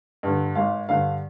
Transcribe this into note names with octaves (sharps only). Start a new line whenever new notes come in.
G2 D3
G#1 F5
G2 D3 F5